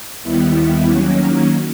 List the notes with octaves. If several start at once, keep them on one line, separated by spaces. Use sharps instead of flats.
D#2 D#3 G3 B3 E4
D#3 F#3 A#3 C#4